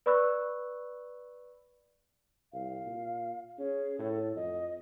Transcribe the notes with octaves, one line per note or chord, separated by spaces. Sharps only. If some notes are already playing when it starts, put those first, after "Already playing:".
B4 D5 B5 C#6 E6 F#6
C2 F5
A#2
C#4 G#4
A2 A4
F2 D#5